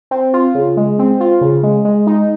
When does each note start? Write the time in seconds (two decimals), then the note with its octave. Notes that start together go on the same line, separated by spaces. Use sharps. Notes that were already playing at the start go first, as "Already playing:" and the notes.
0.11 C4
0.34 F4
0.55 C#3
0.77 G#3
0.99 C4
1.20 F4
1.41 C#3
1.63 G#3
1.85 G#3
2.07 D#4